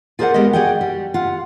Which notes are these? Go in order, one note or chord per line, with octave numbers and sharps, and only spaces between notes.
F4 G#4 A#4 C5 D5 F#5
G#3 B3 G4 A#4 D#5
F#4 G#4 D5 D#5 F#5 G5
G3
F4 F#5